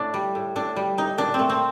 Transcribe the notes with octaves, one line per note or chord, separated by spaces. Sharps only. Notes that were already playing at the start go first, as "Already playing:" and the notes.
Already playing: A2 A3 D4
G3
A2
A2 D4
G3
A2 D#4
A#2 D4
A3 C4
C4